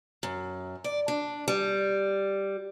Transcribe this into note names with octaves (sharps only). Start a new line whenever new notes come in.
F#2
D5
D4
G3